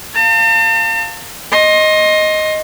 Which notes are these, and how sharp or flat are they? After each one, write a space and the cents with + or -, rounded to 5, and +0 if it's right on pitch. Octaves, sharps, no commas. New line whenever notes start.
F5 +5 A5 +45
D#5 +0 C6 +30